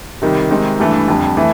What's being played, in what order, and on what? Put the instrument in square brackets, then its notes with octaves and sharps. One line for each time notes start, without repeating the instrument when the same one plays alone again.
[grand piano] C3 D#3 G3
C3 D#3 G#3 C4 D#4
G2 E3 A3
F2 D3 G3
E3 A3